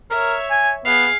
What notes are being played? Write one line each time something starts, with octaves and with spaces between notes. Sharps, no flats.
A#4 C#5 E5
G#5
B3 G#4 F5